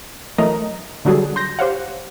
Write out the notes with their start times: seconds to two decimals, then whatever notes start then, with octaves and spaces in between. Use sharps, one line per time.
0.38 E3 F#3 A3 A#4 D#5 A#5
1.05 D3 F#3 G3 F#4 G#4 A4
1.36 C6 G6 A#6
1.59 G4 C5 C#5 F5 F#5